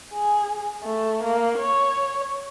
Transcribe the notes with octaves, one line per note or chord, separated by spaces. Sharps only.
G#4
A3
A#3
C#5